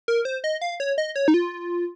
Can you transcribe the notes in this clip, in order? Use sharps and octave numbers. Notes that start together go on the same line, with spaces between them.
A#4
C5
D#5
F5
C#5
D#5
C#5
D#4
F4